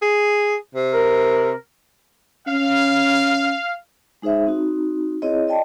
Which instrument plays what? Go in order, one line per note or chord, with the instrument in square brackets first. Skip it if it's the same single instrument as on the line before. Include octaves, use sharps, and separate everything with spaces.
[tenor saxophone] G#4
C3
[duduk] A#4
[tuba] C#4 [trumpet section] F5
[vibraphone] G#3 D#4 G#4 C5 E5
C4 D#4 F#4
C4 E4 G#4 C#5 D#5
D5 D#5 G5 A5